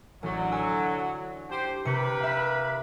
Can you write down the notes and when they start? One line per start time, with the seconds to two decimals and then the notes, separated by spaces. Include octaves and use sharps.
0.23 A1 D3 F#3
0.52 F#4 G#5 E6
1.49 D4 G4 C5
1.85 C3 G4 A#4 B4 C#7
2.21 E5 F5